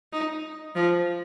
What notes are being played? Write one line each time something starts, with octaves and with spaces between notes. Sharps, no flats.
D#4
F3